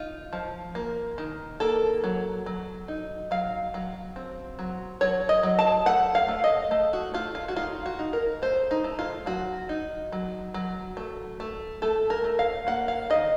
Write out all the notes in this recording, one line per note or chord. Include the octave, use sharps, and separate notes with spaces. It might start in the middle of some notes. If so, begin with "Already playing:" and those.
Already playing: D#4 F4
F3
A#3
D#3
A#3 A4
F#3
F#3
D#4
F#3 F5
F#3
C4
F#3
F#3 C#5
D#5
F#3
A5
A3 F#5
F5
A3
D#5
A3
F#4
A3 F4
F4
F#4
D#4 F4
F#4
D#4
A#4
A3 C5
D#4
A3
F4
F#3 F#4
D#4
F#3
F#3
A3
A3
A3 A4
A#4
A3
F5
A#3 F#5
F5
D#3 D#5